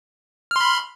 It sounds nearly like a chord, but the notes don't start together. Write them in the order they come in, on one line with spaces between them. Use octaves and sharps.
F6 C6 B5